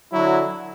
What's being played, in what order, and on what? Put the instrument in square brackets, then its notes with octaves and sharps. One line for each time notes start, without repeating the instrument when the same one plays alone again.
[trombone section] D3 F#3 [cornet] E4